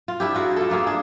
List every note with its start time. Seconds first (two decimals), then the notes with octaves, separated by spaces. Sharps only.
0.08 F4
0.20 D4 E4 G4
0.35 F4 F#4 G#4 A#4
0.56 F4 A4
0.70 A3 A#3 F4 G#4
0.87 D4 G#4